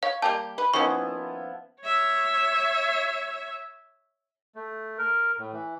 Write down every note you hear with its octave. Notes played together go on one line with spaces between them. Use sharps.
C#5 F5
G3 A#3 G4 A5
B4
D#3 F3 A#3 B3 C#4 E4 C#6
C#5 E5
A3
A#4
A2
E3